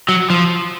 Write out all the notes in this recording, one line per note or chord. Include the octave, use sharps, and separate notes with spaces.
F#3
F3